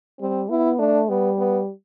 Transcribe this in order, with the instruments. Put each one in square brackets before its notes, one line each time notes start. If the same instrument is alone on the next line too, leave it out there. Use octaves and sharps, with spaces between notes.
[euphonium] G3 [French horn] C4
[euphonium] B3 [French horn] E4
[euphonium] A3 [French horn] D4
[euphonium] G3 [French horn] B3
[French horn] B3